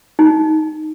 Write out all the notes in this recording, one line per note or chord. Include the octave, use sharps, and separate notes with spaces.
D#4